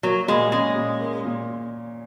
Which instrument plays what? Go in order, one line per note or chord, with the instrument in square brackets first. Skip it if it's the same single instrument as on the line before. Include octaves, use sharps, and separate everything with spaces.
[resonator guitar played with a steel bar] F#3 [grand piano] A#3
[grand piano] A#2 [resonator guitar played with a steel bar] G#3
[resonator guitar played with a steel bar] G#3 [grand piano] C#4
[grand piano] A#2
A#3
A#2